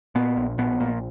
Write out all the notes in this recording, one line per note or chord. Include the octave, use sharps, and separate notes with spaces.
A#2 B3
A#1
A#1 B3
A#2